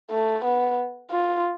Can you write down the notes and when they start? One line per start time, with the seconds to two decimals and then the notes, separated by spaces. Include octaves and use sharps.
0.11 A3
0.44 B3
1.11 F4